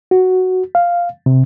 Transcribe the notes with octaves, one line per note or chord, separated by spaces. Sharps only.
F#4
F5
C3